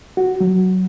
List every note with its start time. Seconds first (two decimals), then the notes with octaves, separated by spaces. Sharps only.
0.17 F#4
0.40 F#3